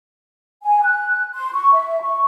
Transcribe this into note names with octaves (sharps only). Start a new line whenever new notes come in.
G#5
F#6
C6
C#6
E5
C#6